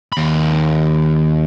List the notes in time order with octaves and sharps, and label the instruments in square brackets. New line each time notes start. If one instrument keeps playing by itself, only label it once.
[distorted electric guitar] D#2 B5